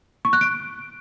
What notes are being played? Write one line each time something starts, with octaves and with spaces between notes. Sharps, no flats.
C#6
F#6
D7